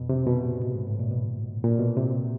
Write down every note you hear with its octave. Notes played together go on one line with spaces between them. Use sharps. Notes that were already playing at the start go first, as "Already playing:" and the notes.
Already playing: F2 B2
C3
B2
A#2
A2
G#2
A2
A#2
B2
A#2
B2
C3